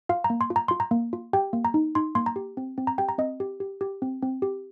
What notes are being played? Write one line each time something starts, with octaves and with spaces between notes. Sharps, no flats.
F4 F5
A#5
A#3
C6
F4
A#5
F4 C6
A#5
A#3
F4
G4 G5
A#3
A#5
D#4
D#4 C6
A#3 C6
A#5
G4
C4
C4
A#5
G4 G5
A#5
C4 D#5
G4
G4
G4
C4
C4
G4